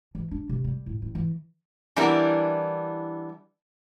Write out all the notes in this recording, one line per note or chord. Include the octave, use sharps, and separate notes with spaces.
E3
D4
C3
G3
A2
A1
E3
E3 G3 B3 D4 E4 A#4